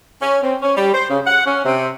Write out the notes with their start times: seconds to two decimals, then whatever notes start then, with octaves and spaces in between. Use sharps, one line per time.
0.22 C#4
0.42 C4
0.62 C#4
0.77 G3
0.94 C5
1.09 C#3
1.26 F#5
1.46 C#4
1.65 C3